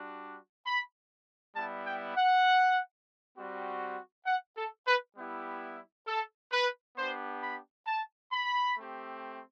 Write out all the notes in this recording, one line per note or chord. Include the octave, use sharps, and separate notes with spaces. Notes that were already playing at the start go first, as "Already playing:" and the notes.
Already playing: G3 D4 F#4
B5
G3 B3 E4 G4 A5
G5
F#5
G3 C4 F#4
F#5
A4
B4
G3 B3 E4 G4
A4
B4
B3 D4 G4 C5
B5
A5
B5
A3 C4 G4